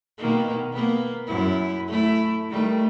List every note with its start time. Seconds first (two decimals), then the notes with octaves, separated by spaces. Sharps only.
0.18 B2 D#3 A#3
0.72 A#3 B3
1.26 F#2 E4
1.88 A3 E4
2.49 D#3 G3 A3